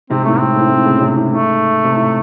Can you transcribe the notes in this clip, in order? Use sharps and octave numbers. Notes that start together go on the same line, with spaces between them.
G#2 C3 C4
A2 A3
G#2 C4
A2
A2
A2 C#3
G#2 C3
A2
G#2 A3
C3
A2